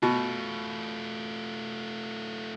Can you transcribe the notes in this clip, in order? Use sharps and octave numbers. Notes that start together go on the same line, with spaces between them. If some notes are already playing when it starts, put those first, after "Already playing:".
B2 A3 F4